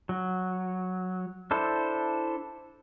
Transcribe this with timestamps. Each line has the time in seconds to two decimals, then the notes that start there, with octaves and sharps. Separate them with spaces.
0.09 F#3
1.51 D4 E4 A4 C5